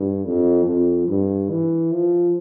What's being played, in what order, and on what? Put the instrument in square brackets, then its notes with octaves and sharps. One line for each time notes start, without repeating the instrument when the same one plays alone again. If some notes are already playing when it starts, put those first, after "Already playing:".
Already playing: [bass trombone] G2
F2
F2
G2
E3
F3